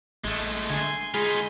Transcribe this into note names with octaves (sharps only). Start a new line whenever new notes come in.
A1 G#3 A3
D3 G#5 C6
G#3 D#4 F4 G#4 B5 C6